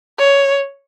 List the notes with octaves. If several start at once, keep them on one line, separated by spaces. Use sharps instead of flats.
C#5